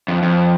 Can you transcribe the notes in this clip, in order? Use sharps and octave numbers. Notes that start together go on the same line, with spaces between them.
F2
F2